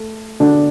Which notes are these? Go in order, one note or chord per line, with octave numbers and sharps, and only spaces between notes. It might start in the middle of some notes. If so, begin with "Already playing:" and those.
Already playing: A3
D3 D4